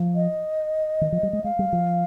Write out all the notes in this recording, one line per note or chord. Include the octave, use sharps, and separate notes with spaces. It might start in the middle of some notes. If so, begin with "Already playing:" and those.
Already playing: F3
D#5
D#3
F3
G3
G#3
G#3 F5
G3
F3